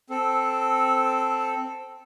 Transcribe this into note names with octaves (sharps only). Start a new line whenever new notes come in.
C4 A4